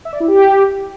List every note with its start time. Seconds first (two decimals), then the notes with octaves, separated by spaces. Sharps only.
0.05 E5
0.13 D5
0.20 E4
0.28 G4